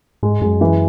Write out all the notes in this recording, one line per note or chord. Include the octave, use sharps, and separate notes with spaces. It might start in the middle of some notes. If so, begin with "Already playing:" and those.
G#2 G#3
F#2 G#3
E3